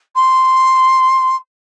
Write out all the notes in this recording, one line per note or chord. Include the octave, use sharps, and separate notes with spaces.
C6